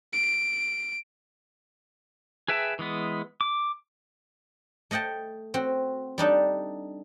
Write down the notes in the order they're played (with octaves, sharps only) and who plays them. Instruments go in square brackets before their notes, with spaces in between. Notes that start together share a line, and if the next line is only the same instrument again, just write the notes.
[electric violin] D7
[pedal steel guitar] G#4 B4 E5 G5 A5
E3 G#3 B3
D6
[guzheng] A3 D#5 F#5 G5 A5
C4 F#4
G3 D4 D#4 A4